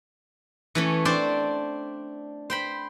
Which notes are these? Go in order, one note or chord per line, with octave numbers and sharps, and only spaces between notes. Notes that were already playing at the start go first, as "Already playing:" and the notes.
E3 A3 C#4
C4 D4 C5 D5
C5 G5 B5